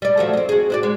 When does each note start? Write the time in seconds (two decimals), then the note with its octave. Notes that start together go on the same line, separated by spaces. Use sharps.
0.02 G3 D5
0.17 F3 F#3 A3
0.33 C4 D#5
0.49 F#4 G#4
0.70 C4 F#4 D5
0.83 G#3